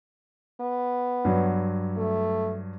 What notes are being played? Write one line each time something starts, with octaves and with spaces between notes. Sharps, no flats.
B3
G2 F#3
A3